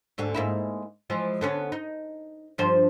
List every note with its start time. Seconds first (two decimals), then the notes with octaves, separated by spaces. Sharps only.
0.18 D2 G#2 D3
0.34 G#2 A#3 E4
1.10 E3 F3 G#3
1.41 D3 B3 C#4
1.72 D#4
2.58 G2 F3 C5